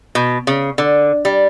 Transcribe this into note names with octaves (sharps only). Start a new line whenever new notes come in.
B2
C#3
D3
G3